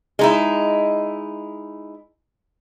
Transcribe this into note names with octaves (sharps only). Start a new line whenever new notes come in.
G#3 D#4 E4